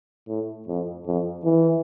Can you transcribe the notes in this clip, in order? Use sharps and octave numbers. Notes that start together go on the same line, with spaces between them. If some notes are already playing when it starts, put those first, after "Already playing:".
A2
F2
F2
E3